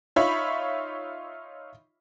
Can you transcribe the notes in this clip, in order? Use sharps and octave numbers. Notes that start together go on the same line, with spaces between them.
D#4 F4 C#5 E5 B5 C#6